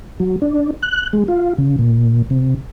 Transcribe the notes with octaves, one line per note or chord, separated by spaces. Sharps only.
F#3
D4
F#6
G#3
F4
C#3
A#2
C3